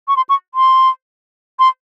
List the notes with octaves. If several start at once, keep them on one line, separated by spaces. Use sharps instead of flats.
C#6
C6
C#6
C6
C6